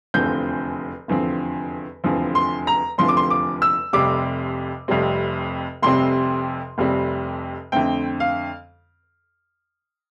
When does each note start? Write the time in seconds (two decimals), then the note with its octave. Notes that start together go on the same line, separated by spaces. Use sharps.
0.14 F1 E2 D3 F3 C4 G6
1.08 F1 E2 D3 F3 C4
2.04 F1 E2 D3 F3 C4
2.35 C6
2.67 A#5
2.98 F1 E2 D3 F3 C4 C6
3.08 D6
3.17 C6
3.30 D6
3.62 E6
3.93 F1 F2 C3 G3 C4 D6
4.88 F1 F2 C3 G3 C4
5.83 F1 F2 C3 G3 C4 C6
6.78 F1 F2 C3 G3 C4
7.72 F2 D3 A3 C4 G5
8.20 F5